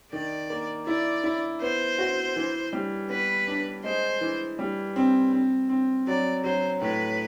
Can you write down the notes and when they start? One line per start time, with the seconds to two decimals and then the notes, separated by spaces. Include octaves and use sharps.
0.13 D#3 D5
0.50 A#3
0.87 E4 D5
1.24 E4
1.62 B3 C5
1.99 F#4
2.36 E3
2.73 G3
3.10 B3 B4
3.47 D4
3.84 G#3 C5
4.21 E3
4.59 G3
4.96 C4
5.33 C4
5.69 C4
6.07 F#3 D5
6.44 F#3 C5
6.81 A2 B4